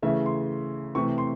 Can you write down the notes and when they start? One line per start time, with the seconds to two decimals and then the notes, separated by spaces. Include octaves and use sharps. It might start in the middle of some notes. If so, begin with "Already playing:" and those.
0.02 C#3 E3 A3 E5
0.26 C6
0.95 C3 E3 A3 C#6
1.18 C6